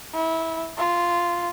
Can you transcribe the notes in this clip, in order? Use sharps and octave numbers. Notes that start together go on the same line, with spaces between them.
E4
F4